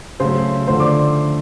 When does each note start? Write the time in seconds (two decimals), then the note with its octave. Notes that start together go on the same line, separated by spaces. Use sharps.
0.20 C#3 F#3 A3 C5 C6
0.68 D3 F3 A3 C5 C6
0.80 D5 D6